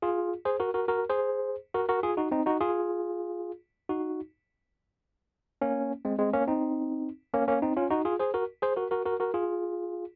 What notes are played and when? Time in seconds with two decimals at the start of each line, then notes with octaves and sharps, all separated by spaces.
0.02 F4 G#4
0.45 G#4 C5
0.60 F#4 A#4
0.74 F#4 A#4
0.88 F#4 A#4
1.09 G#4 C5
1.74 F#4 A#4
1.89 F#4 A#4
2.03 F4 G#4
2.17 D#4 F#4
2.32 C4 D#4
2.46 D#4 F#4
2.60 F4 G#4
3.89 D#4 F#4
5.61 A#3 C#4
6.05 G#3 C4
6.19 G#3 C4
6.33 A#3 C#4
6.48 C4 D#4
7.34 A#3 C#4
7.48 A#3 C#4
7.62 C4 D#4
7.77 C#4 F4
7.90 D#4 F#4
8.05 F4 G#4
8.20 G#4 C5
8.34 F#4 A#4
8.62 G#4 C5
8.76 F#4 A#4
8.91 F#4 A#4
9.06 F#4 A#4
9.20 F#4 A#4
9.34 F4 G#4